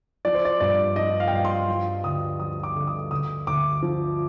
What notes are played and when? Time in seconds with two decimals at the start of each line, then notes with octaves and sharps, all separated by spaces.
0.25 F3 D5
0.35 C5
0.45 D5
0.60 G2 D5
0.96 F3 D#5
1.20 F5
1.28 G5
1.32 G2 F5
1.45 C6
1.68 F3
2.04 D2 D#6
2.39 F3 D#6
2.63 D6
2.75 D3
2.87 D#6
3.11 D2 D#6
3.47 D2 D6
3.83 F3